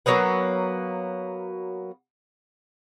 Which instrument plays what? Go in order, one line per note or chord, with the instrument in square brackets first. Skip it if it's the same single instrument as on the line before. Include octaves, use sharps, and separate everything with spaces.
[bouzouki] F#3 A#3 B3 B4